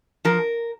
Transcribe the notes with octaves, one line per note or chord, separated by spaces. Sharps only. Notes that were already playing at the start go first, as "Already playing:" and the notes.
F3 A#4